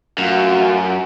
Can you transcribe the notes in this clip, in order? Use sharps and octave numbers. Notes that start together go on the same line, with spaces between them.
F#2 A3 F4 F#4